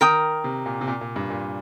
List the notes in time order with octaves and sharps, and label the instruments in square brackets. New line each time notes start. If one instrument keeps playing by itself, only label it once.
[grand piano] D#3 [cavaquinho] A#4 G5 D#6
[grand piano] C3
A#2
C3
A#2
A#2
G2
A#2